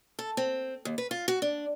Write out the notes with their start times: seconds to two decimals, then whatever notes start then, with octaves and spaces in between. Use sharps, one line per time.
0.19 A4
0.37 C4
0.85 D#2
0.98 B4
1.11 F4
1.28 F#4
1.42 D4